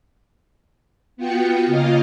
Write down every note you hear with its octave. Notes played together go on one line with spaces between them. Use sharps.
B3 F4 F#4 G5 C#7
C#3 A#3 F4 D#5 F5